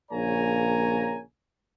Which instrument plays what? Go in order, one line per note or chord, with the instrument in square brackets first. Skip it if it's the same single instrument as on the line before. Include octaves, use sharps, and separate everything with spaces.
[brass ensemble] A#1 C#3 A#3 C#5 G#5 A#5